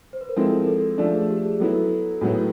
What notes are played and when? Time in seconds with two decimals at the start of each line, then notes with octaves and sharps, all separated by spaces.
0.13 C5
0.21 B4
0.29 A#4
0.36 F3 G#3 C4 E4 A4
0.52 A#4
0.67 A4
0.98 F3 A3 D4 A4
1.14 G#4
1.29 G4
1.45 G#4
1.60 F#3 B3 E4 A4
2.21 A2 F#3 B3 E4